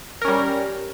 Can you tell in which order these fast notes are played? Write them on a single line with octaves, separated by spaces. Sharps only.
A#4 C#4 G3